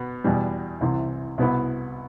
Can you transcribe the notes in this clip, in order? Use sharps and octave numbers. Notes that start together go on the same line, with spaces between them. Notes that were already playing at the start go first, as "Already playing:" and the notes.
Already playing: B2 B3
E2 B2 G3
C2 C3 E3
C2 B2 B3 E4